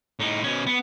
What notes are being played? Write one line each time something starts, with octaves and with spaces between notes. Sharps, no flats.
A2 D#4
B2 C#4
B3